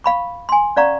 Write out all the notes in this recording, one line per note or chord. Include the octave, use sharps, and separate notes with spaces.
F5 B5 C#6
G#5 C6
C#4 D5 F5 A#5 C#6